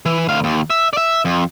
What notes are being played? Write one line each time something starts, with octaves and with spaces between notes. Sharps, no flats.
E3
D2 F5
D#2
E5
D5 E5
F2